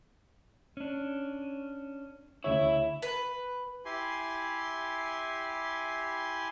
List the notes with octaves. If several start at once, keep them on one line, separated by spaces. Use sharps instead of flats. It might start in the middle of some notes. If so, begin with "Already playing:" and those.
C#4 D4
D2 C#3 E4 C#5
B4
E4 G4 G#5 C6